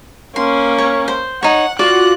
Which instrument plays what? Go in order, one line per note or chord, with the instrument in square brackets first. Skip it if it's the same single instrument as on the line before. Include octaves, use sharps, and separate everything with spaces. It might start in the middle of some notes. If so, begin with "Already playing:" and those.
[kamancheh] A#3 C#4 [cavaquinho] C6
[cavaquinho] C#5
C5
[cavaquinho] D#4 C#5 [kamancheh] F#5
[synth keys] F4 F#4 [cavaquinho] D5 [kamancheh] F#6